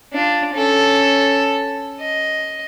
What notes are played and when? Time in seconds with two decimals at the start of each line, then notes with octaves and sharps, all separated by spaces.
0.13 D4 F4
0.54 C#4 A4
2.00 D#5